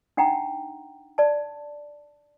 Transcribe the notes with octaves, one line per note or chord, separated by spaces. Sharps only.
D4 D#4 F#5 G5 A#5
D5 A5